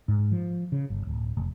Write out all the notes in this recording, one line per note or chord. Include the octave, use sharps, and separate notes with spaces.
G#2
F3
C#3
G1
D1
F1